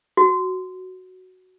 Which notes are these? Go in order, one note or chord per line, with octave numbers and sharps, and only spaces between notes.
F#4